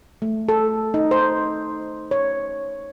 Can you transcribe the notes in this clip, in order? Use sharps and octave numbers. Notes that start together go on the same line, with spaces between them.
A3
A4
D#4
C5
C#5